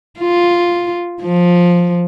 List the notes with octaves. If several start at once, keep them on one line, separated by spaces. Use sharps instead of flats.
F4
F3